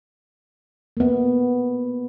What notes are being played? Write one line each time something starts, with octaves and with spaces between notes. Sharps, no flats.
A#3 B3